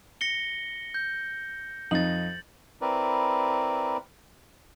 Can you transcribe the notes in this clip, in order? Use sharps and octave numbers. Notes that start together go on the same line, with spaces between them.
A#6 C#7 G7
G6
F2 D#4 A6 F#7
C4 E4 A#4 B4 D5